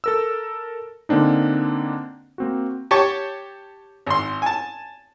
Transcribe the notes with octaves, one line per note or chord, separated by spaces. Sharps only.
A4 A#4 E6
D3 A#3 C4 D4 D#4
A#3 C4 F#4
G4 C#5 A5 C#6
G#1 C6
G#5 A5